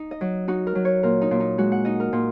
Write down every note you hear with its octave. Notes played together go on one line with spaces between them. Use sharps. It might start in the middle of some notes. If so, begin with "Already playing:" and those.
Already playing: D#4
D#5
F#3
D#4 F#4
A#4
F#3
C#5
A#2 A#4
D#4
A#2
D#4
G#3 F#4
F#5
D#4 D#5
A#4
A#2